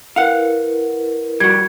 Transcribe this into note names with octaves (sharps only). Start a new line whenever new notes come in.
E4 A#4 B4 F5 F#5
G3 F#4 G#6